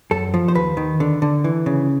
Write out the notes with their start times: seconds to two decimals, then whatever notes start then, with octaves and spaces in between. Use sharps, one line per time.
0.11 F#2 A4
0.34 F3
0.48 C5
0.55 D#2 B4
0.77 D#3
1.00 D3
1.22 D3
1.44 E3
1.66 C#3